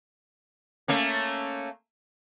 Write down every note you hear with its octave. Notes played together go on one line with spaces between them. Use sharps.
A3 A#3 C#4